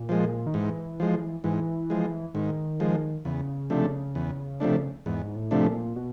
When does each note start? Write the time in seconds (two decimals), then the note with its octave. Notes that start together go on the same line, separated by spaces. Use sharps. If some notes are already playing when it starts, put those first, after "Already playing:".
Already playing: A#2
0.09 F3 G#3
0.46 D#3
0.54 G#2 E3
1.00 F3 G#3
1.44 G#2 E3
1.90 F3 G#3
2.34 G#2 D#3
2.80 F3 G#3
3.25 E2 C#3
3.70 C3 F3 A3 D4
4.15 E2
4.60 C3 F3 A3 D4
5.06 E2 G#2
5.36 A2
5.51 C3 F3 A3 D4
5.66 A#2
5.96 B2